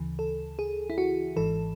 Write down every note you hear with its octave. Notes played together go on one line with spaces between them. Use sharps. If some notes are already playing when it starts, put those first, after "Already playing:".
Already playing: D2 C#3 E3
A4
G#4
E4
F#4
G#1 G#2 E3 A4